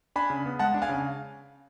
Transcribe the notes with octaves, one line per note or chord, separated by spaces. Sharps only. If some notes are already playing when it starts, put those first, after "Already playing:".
D4 G#5 B5
C#3
B3
G#3 F#5 A5
D4
F5 G#5
C#3